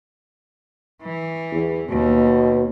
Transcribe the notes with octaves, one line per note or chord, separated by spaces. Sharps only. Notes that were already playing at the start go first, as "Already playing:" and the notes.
E3
E2
D#2 B2